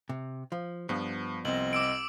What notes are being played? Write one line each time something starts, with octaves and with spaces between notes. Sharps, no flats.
C3
F3
G2 F3 B3
C2 C4 D#5 F#7
D6 E6 D7